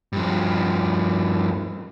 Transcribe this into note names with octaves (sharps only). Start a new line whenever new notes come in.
G2 F3